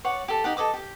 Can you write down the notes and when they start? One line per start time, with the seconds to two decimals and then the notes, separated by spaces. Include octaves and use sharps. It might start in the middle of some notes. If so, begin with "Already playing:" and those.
0.04 C#5 D5 F#5
0.28 G4 A4
0.44 D#4 G4 F#5
0.57 A4 D5 D#5 D6
0.74 G4